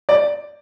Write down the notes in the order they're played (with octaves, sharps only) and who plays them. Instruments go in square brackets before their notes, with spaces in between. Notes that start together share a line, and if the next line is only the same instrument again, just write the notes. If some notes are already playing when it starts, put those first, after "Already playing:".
[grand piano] D5